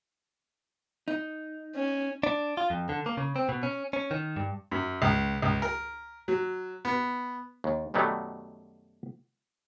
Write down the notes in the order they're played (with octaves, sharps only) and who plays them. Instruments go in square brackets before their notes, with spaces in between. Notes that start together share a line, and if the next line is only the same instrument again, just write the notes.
[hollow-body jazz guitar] D#4
[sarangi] C#4
[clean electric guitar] D4
F4
F2
D3
A#3
C#3
C4
B2
C#4
C#4
D#3
G2
[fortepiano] F#2
C#2
C#2
A#4
F#3
B3
[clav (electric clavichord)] D#2
F#2 B2 D#3 F#3 G3 A3